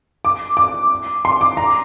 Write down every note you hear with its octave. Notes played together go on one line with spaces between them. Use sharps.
D6
D6
C6
D6
A#5